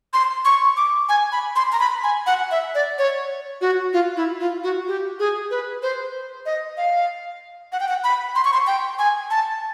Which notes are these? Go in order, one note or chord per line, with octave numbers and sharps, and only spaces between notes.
C6
C#6
D6
G#5
B5
C6
A#5
B5
G#5
F#5
E5
D5
C#5
F#4
F4
E4
F4
F#4
G4
G#4
B4
C5
D#5
F5
F#5
G5
F#5
B5
C6
C#6
C6
G5
G#5
A5